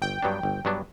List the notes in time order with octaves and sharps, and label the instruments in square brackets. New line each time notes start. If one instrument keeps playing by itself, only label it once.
[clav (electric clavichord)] G1 [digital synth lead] G5
[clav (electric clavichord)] G2 F#3 B3 D4
G1
G2 F#3 B3 D4